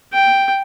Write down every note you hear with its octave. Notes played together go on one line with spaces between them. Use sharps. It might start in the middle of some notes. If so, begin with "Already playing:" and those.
G5